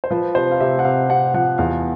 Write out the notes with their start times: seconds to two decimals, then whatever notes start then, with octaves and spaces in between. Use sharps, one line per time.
0.04 C5
0.11 F3 B4
0.35 C3 C5
0.51 F5
0.60 C3 E5
0.79 F#5
0.84 C3 F5
1.10 C3 F#5
1.34 F3 F#5
1.58 E2 F5